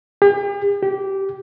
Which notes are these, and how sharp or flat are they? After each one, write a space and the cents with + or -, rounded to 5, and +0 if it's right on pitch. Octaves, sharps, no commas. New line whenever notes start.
G4 +45
G4 -15